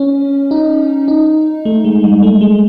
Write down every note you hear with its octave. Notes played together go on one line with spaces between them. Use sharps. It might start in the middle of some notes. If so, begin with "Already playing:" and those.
Already playing: C#4
D#4
D#4
A3
G#3
G3
A3
G#3